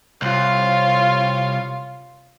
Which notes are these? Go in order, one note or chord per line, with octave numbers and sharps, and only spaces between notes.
C2 F4 C#5 F5